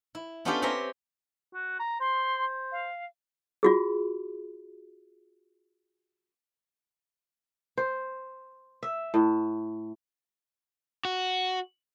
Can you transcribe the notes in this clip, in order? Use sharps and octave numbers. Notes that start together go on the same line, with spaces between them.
E4
B3 C#4 D4 F4 G4 A4
C4 G4 C#5 E5 G#5 A#5
F#4
A#5
C5 C6
F5
F4 F#4 G#4
C5
E5
A2
F#4